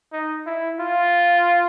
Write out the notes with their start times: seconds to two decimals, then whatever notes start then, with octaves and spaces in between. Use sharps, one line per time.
0.13 D#4
0.46 E4
0.80 F4